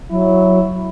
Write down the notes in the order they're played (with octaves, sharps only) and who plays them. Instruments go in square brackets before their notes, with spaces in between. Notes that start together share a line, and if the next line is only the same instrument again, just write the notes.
[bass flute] F#3 [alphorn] E4